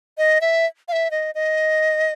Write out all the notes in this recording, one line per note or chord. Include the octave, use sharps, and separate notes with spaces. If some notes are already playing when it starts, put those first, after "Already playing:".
D#5
E5
F5
E5
D#5
D#5